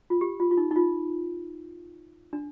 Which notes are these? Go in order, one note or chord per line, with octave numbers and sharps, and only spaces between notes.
F4
G4
F4
F4
D#4
D#4
F4
D4